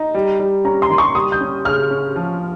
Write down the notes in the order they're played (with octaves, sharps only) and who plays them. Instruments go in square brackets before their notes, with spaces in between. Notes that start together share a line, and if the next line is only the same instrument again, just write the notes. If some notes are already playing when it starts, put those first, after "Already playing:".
Already playing: [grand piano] D#4 [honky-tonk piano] A#5
[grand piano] G3
G3
[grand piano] C#4 [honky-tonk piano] A#5
[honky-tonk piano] C6
[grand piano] D#3
[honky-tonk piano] C#6
[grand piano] G3 [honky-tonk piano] D#6
[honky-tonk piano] G6
[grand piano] C#4
[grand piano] C#3 [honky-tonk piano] F6
[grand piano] C#4
F3